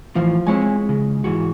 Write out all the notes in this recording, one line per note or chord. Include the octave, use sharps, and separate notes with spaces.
A2 E3 F3 F4
G#3 C4 E4 C#5 G#5
C#3
G#2 E3 F#4